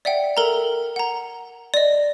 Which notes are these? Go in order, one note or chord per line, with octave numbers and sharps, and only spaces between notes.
D5 E5 F#5 G5
A4 A#4 A#5
F#5 A#5
D5 D#5